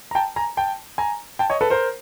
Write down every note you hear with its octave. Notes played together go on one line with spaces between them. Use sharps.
A#5
G5 A5
G#5 A#5
G5 A5
G#5 A#5
G5 A5
C#5 D#5
A4 B4
A#4 C5